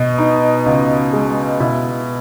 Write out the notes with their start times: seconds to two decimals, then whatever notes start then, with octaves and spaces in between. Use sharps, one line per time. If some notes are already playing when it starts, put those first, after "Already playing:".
Already playing: B2 D#5
0.18 D#4
0.66 C#2
1.13 G#3
1.60 B2 E4